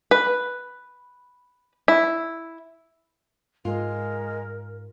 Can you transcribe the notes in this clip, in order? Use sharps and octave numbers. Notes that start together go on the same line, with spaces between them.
B4
E4
G#2 G#3 F4 A#4